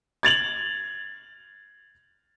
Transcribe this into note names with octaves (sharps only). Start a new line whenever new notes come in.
G#6 A6 F7 F#7